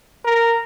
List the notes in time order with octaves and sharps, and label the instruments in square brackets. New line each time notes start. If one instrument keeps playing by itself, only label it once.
[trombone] A#4